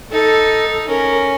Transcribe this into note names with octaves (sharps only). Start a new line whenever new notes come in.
D#4 A4
C#4 A#4